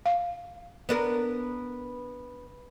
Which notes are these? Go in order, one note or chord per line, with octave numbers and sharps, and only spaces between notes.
F5
B3 D4 A#4